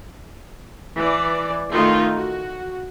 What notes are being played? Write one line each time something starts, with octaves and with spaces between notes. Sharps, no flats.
E3 D5
D#3 A3 D#4 F4
F#4